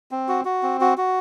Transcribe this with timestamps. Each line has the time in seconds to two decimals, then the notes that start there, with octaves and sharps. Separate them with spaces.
0.11 C4
0.28 F#4
0.45 F#4
0.63 C4
0.81 F#4
0.97 F#4